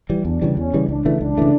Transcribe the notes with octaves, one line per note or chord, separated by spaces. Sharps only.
E3 G3
E2 D4
C#3 E3 G3
E2 C#4
C#3 E3 G3
C#2 D4
C#3 E3 A3
C#2 D4
C#3 E3 A3